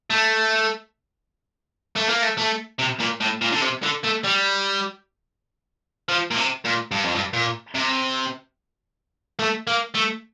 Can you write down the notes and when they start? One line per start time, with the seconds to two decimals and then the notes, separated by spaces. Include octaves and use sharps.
0.10 A3
1.96 A3
2.09 A#3
2.23 A3
2.38 A3
2.79 C3
3.00 A#2
3.21 A2
3.42 A#2
3.52 D3
3.62 C3
3.83 D3
4.04 A3
4.24 G3
6.09 F3
6.31 A#2
6.37 C3
6.65 A#2
6.91 G2
7.04 F2
7.15 G2
7.33 A#2
7.75 C3
9.39 A3
9.67 A#3
9.95 A3